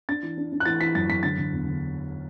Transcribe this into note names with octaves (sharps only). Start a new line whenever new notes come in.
D4 A6
E3
D4
D4
F#6
E3 A6
E3 B6
F#2 A6
F#2 B6
D3 A6
D3
E2
D3